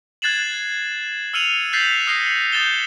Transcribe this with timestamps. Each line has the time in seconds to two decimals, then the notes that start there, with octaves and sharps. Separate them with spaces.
0.22 F#6 G#6 A6 C7 E7 F#7
1.34 E6 F6 C#7 D#7 F7
1.73 F#6 G6 A6 B6 C7
2.07 D#6 F6 F#6 A#6 C7 C#7
2.52 D#6 G6 A6 E7 G7